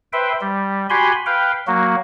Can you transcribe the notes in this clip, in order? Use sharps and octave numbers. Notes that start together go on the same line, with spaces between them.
B4 C5 E5 G5
G3
F#4 G4 G#5 B5 C6
B4 F5 G5
F#3 A#3 F#4